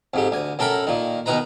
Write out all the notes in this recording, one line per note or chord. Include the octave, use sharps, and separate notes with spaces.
F2 G#2 G4
D2 G#5
F#2 A4 A#4 G5 B5
A#2 D#3
B2 D#3 D#4 B4 A#5